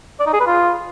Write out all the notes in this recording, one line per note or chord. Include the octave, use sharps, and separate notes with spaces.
D5
D#4
G#4
B4
F4